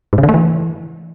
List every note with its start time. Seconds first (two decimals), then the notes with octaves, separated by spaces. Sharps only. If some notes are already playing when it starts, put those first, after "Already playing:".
0.13 G#2
0.18 C#3
0.23 D3
0.29 A3
0.34 E3